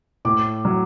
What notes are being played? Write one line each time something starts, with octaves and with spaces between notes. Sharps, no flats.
A2 D6
F#3